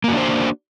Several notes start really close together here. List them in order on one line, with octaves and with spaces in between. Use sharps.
A#3 F#4 D4 C5